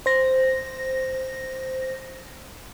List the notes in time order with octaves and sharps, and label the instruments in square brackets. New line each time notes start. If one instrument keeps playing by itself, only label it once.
[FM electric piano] C5 A#6